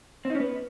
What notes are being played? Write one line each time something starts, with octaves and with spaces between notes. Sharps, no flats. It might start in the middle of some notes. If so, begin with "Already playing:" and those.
C4
D#4
C#4
B3